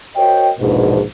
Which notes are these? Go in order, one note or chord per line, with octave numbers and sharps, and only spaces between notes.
F#4 A#4 C5 C#5 D#5 G5
A#1 E2 G#2 B2